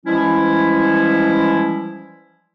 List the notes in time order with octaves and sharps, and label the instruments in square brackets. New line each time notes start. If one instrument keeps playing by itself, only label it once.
[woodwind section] E3 F3 G3 G#3 C#4 E4